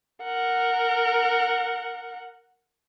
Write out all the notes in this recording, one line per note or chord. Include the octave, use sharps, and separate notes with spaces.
A#4 F#5